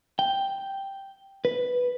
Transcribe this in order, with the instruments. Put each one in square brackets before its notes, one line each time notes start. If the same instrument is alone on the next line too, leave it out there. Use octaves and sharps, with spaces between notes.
[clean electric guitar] G5
B4